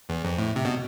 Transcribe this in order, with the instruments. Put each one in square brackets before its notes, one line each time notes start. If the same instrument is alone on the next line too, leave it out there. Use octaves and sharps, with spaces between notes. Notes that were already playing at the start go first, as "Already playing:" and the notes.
[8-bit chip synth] E2
F2
A2
C3
B2